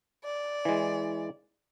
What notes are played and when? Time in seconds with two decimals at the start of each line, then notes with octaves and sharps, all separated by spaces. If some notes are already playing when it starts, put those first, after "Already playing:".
0.25 D5
0.65 E3 G#3